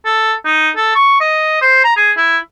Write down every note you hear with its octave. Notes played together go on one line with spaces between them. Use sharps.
A4
D#4
A4
C#6
D#5
C5
A#5
G#4
E4